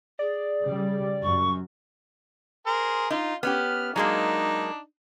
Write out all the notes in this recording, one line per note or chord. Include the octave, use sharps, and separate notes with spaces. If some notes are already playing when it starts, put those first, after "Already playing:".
G#4 D5
C#3 G3
F#2 C#6
G#4 A#4 C5
D#4 F4
B3 C#4 G4 F6
F#3 G#3 A#3 D4 D#4